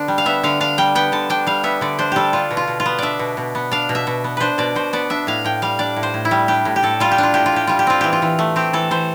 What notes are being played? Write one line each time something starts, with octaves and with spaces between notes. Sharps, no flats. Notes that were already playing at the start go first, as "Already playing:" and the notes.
Already playing: D3 B3 D4
G3
F5
B3 E5
D3 F5
D4 F5
G3 G5
B3 G5
D3 A5
D4 G5
G3 F5
B3 E5
D3 D5
D4 C5
G3 G4 A4
D4 F4
B2
F4
B2
F4
B3
D4 D5 E5
B2
B2
B3
D4 F5
B2
E5
B2
B3
D4 B4 C5
B2 D5
B2 C5
B3 D5
D4 E5
A2 F5
A2 G5
G3 F5
D4 D5
A2
C5
A2
E4
G3
D4 G4
A2
G4
A2 A4
G3 F4
G4
D4 F4
A2 G4
F4
A2 G4
G3 F4
G4
C4 F4
E3 G4
F4
E3
A3
C4 G4
E3 A4
E3 C5